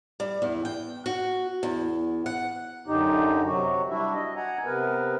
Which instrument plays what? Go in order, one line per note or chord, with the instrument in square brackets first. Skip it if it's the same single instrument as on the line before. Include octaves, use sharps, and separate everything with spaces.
[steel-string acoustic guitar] G3
E2
G5
F#4
E2
F#5
[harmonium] F#2 D3 D#4 G4
C3 F#3 F#4
G3 D4 E4 F#4 E5
D#5
F#5 G#5 A#5
C3 B3 A#4 B4